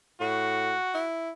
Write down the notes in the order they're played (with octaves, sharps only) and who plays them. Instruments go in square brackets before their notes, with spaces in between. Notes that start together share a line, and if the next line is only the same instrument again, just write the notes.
[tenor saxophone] A2 [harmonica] F#4
[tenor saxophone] E4